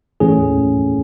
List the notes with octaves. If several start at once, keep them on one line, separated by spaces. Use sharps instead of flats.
A2 E3 A3 C#4 G#4